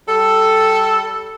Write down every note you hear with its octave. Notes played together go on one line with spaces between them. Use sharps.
G3 A4